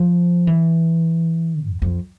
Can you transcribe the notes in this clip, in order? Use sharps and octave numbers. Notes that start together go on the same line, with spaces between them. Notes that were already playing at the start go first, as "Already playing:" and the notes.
Already playing: F3
E3
F2
F2